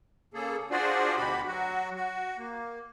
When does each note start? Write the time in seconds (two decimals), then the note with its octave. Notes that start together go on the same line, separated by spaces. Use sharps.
0.34 C#3 A#3 G#4 A4
0.70 D4 F4 F#4 G#4 C5 D5
1.16 D2 B2 F#4 G4 B5
1.46 F#3 F#4
1.96 F#4
2.38 A#3